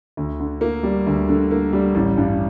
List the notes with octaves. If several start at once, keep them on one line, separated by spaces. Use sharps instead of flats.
D2
D3
A#3
G3
D2
D3
A#3
G3
A1
G2